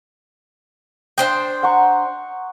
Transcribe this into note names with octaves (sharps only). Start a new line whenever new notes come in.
D4 C5 G5 D#6
F#5 A#5 C#6